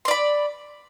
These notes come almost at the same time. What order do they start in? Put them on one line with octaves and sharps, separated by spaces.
C6 D5 B5